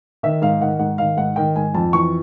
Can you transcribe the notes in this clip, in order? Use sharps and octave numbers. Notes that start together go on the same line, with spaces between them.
D#3 E5
G#2 F5
D#3 F#5
G#2 F#5
D#3 F5
G#2 F#5
D#3 G5
G#2 G#5
F2 A5
E3 C#6